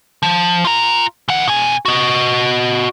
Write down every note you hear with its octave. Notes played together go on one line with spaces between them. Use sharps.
F3
F4 A#5
E3 F#5
B2 G#5
F#4 D#5